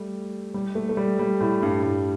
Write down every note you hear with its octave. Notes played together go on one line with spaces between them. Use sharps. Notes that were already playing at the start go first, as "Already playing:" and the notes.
Already playing: G3 A3
G3
A3
A3
G3
G3
A2
G2
A2